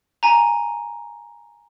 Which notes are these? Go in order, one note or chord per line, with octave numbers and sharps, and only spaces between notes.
G#5 A#5